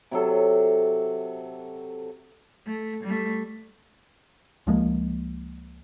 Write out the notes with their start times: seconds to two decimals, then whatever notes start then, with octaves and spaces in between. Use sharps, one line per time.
0.11 C3 F#3 A4
2.66 A3
3.04 G3 A3
4.67 C#2 F3 G#3 A#3